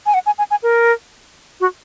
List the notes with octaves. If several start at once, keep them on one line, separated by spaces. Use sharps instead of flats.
G#5
F#5
G#5
G#5
G#5
A#4
F#4